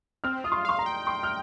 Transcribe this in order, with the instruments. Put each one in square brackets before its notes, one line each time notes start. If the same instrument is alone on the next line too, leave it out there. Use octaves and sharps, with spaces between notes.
[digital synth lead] C4 [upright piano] F6
[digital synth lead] F4 [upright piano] D#6
[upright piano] C6
[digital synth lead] F5 [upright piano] C6
[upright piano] A#5
[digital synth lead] G5
[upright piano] C6
F6